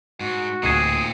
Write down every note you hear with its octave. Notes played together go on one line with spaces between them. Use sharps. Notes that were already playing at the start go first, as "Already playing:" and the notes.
G#2 F#4
D1 A#2 C4 D#4 G#4 D#7